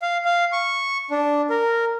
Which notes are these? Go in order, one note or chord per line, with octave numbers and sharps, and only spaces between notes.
F5
F5
C#6
D4
A#4